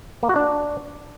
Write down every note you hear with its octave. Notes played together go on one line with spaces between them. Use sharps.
A#3
F#4
D4